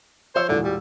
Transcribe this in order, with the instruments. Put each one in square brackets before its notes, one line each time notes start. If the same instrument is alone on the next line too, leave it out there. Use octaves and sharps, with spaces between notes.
[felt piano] F3 C#5 E6 [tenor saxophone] C5
[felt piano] E1 A#2 E3 [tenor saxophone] D3
[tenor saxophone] G3